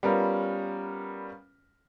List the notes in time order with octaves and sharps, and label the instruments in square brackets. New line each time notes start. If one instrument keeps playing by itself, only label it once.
[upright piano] G3 B3 C#4 F4 A#4